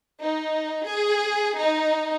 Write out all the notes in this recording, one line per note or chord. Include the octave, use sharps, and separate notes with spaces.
D#4
G#4
D#4